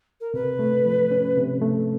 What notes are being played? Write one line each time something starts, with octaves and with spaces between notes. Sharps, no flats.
A#4
C3 B4
A3
F3
C#4
C3
A3